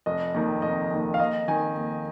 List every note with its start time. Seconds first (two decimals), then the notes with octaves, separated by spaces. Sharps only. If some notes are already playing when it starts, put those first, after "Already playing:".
0.06 F1 D#5
0.34 D#2 D#3
0.62 F1 D#5
0.91 D#2 D#3
1.14 F5
1.19 D#2 D#5
1.48 D#3 G#5
1.76 D#2